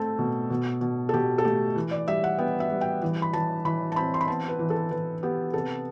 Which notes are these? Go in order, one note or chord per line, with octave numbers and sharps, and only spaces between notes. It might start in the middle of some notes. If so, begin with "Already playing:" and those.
Already playing: A3 C4 A4
B2
B2
B2
A4
B2 G4
A4
A3 G4
E3
D5
G3 E5
F#5
B3 G5
E5
G3
G5
E3
B5
E3 A5
E3 B5
A5
C4 B5
C6
B5
B3 A5
B4
E3
A4
E3 B4
B3 G4
C3 A4